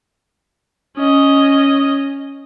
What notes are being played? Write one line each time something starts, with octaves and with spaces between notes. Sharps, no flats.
C#4 D#5